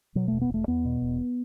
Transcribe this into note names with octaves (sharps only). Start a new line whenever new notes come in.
B2 F#3
A3
E1
B3
E1 A3
E2 B3
B2
E1